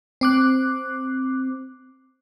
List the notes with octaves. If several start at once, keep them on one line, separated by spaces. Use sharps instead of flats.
C4 D6 F#6